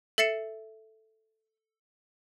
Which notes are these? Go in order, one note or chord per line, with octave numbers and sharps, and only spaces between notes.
A4 E5 A6 C7 C#7 E7